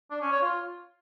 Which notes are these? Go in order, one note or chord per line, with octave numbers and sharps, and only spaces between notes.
D4
C#4
C#5
F4